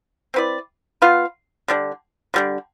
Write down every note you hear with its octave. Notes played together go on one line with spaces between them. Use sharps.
C4 E4 B4 D5
B3 F4 B4 F5
D3 G3 D4
D3 G3 D4